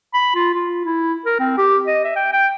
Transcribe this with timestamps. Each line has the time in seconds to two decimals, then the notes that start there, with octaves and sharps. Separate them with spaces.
0.14 B5
0.35 F4
0.55 F4
0.85 E4
1.26 A#4
1.40 C4
1.58 G4
1.87 D#5
2.05 E5
2.16 G5
2.33 G5